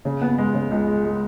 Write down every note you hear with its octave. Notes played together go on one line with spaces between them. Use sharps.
C#3
B3
G#3
C#3
C#2
G#3
G#3